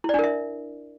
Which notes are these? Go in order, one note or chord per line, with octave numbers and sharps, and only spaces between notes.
D4 E4 A#4 D5 E5